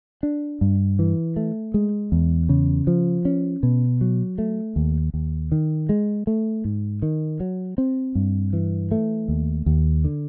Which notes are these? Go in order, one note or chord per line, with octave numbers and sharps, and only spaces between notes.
D4
G2
E3
A3
G#3
E2
C#3
F3
C#4
B2
F#3
A3
D#2
D#2
D#3
G#3
A3
G#2
D#3
F#3
C4
G2
E3
A3
D#2
D#2
D3